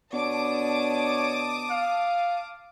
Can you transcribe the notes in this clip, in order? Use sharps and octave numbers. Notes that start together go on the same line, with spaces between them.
B2 D4 C#5 A5 D6 D#6
F5